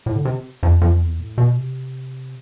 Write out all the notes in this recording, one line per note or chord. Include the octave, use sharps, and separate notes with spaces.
A2
D3
C3
F2
F2
E2
A2
B2
C3